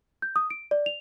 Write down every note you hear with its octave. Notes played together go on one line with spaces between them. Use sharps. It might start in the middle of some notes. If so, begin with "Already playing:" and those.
G6
D#6
D7
D5
F7